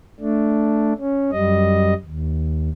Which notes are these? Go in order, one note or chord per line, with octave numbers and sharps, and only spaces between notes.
A3 D4
C#4
F#2 G3 D#5
D#2